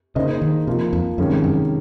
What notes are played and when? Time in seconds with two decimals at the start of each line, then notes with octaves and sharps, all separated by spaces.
0.15 C#3 A#3 D#4 G#4 C5 D#5
0.42 D#3
0.67 C3 F3 A#3 F4
0.93 F2
1.18 F#2 C3 D#3 G#3 C#4
1.31 G#2
1.44 F#2